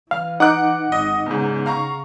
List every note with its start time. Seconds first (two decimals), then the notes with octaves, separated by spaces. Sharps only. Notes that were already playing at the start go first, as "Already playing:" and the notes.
0.11 E3 F5 F6
0.40 D#4 F#5 D6 F#6
0.92 G#1 D#5
1.26 E2 G#2 C#3
1.66 F5 A#5 C#6